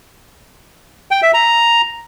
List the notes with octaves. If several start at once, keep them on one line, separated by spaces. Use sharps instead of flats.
G5
E5
A#5